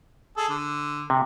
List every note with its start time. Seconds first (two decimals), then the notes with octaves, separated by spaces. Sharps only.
0.37 G#4 A4
0.49 D3
1.10 C3